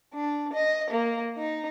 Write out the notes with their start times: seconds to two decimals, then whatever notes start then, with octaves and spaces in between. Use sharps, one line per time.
0.14 D4
0.53 D#5
0.90 A#3
1.38 D#4